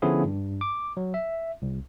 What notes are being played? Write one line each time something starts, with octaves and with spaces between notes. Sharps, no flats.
D3 F3 B3 C#4 E4 G#4
G2
D6
F#3
E5
C2